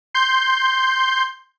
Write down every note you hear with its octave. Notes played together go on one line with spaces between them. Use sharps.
C6 G6